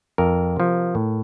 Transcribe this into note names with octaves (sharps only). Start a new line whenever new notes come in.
F2 A#4
C3 F3
A2